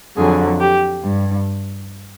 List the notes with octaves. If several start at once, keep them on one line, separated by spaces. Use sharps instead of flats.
F2 D3 F#3 G#4
G4
G2